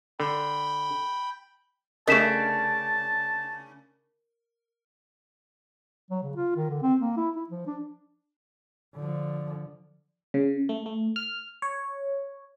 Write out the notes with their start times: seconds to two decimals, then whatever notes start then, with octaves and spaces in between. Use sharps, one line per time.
0.20 D3 G5 B5
2.07 C#3 A3 D4 A#4 D#5 A5 B6 E7
6.10 F#3
6.23 C#3
6.36 F4
6.56 D#3
6.70 D3
6.83 C4
7.00 A#3
7.16 E4
7.36 E4
7.49 F3
7.67 D4
8.96 D3 F3
10.34 C#3
10.69 A3
10.86 A3
11.16 F6
11.62 C#5